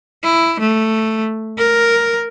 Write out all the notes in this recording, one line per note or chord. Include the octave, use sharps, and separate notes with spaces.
E4
A3
A#4